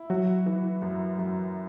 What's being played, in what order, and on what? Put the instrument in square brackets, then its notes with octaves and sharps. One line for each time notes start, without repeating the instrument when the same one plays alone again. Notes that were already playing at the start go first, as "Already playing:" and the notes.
Already playing: [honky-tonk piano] E4
[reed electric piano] F#3 [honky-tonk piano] F#4
[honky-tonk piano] E3
F#2
F#2